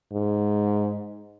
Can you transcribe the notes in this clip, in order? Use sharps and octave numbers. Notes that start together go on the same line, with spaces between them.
G#2